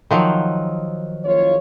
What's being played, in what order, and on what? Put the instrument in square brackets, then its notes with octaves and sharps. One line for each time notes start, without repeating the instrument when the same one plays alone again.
[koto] D#3 F3 F#3
[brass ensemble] F#1 F4 C#5